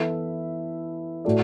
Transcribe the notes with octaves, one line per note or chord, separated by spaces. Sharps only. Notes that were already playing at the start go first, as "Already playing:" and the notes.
Already playing: E3 B3 E4 A4 E5
A2 A3 F#4 A4 D5